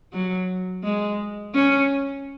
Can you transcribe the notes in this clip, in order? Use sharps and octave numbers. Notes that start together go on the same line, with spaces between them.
F#3
G#3
C#4